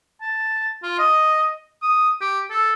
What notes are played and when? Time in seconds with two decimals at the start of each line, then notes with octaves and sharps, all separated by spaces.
0.21 A5
0.83 F4
0.98 D#5
1.82 D#6
2.21 G4
2.50 A4